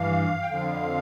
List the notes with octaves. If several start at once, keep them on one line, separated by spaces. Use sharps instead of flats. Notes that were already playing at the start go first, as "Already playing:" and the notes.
Already playing: G2 E3 F5
G5
F2 D3 F3 F5